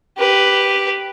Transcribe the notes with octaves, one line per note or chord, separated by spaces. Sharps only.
G4 B4